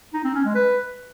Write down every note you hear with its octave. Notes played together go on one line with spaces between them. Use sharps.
D#4
C4
C#4
G#3
B4